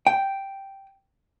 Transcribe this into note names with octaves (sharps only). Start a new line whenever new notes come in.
G5